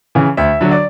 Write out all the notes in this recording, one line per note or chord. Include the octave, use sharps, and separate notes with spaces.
C#3 E3
D2 E5
D3 F#3
D5